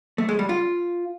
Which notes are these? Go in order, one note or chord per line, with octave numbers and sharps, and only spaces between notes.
A3
G#3
G3
F4